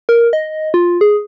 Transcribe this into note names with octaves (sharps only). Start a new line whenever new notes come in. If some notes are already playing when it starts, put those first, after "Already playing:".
A#4
D#5
F4
G#4